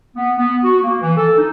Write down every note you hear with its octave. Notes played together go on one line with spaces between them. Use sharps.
B3
B3
F#4
A#3
E3
A4
D#4